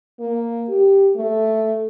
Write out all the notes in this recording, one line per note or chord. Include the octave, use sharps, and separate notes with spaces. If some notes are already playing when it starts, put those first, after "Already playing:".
A#3
G4
A3